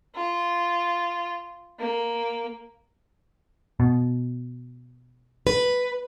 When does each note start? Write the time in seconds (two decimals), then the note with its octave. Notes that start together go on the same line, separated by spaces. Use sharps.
0.15 F4
1.79 A#3
3.80 B2
5.47 B4